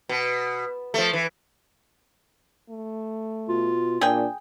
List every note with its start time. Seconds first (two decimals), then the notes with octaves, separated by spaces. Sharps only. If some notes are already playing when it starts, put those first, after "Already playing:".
0.09 B2
0.94 F3 A3
1.13 E3
2.70 A3
3.49 B2 F4
4.01 A#2 D4 G#4 G5